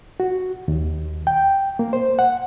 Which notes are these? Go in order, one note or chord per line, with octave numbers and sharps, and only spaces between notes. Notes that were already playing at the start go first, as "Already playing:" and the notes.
F#4
D#2
G5
A#3
C5
F#5